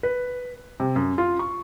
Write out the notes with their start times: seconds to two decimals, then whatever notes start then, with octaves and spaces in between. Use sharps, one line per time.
0.03 B4
0.80 C3
0.96 F#2
1.18 F4
1.39 C#6